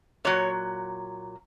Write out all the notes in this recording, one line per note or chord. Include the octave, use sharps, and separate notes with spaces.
A#2 F#3 C#5